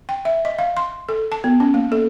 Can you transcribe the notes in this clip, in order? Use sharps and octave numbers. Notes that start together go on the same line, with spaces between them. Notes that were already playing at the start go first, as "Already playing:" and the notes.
G5
E5
D#5
F5
C6
A4
A5
B3
C#4
A#3
A4